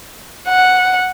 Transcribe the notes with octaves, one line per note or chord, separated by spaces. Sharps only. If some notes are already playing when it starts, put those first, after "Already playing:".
F#5